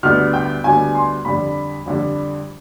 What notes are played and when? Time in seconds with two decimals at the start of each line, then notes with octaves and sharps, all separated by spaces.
0.03 D2 D3 G3 B3 F6
0.34 G5
0.64 D2 D3 G3 B3 G#5
0.95 C6
1.25 F2 D3 G3 B5
1.86 F2 D3 G3